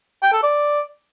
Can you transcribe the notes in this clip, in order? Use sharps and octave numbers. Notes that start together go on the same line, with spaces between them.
G5
A4
D5